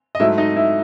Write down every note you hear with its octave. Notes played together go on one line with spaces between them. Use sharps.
D#5
G#2 F#3 A3 E4 E5
D#4 D#5
E4 E5